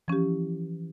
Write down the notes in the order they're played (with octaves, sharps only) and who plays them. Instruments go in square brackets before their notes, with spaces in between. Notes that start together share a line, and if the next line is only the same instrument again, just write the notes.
[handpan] E3 [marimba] F3 C#4 G4